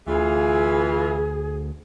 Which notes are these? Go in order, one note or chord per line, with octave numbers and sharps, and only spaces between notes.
D2 E3 F4 G#4